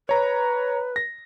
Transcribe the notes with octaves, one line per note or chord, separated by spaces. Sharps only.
B4 C#5 A#5
A#6